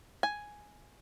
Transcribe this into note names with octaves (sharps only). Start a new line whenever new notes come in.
G#5